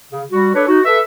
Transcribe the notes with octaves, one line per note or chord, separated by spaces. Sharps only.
C#3
G3 F#4
D4 A4 B4 C#5
D#4 F#4
A4 B4 E5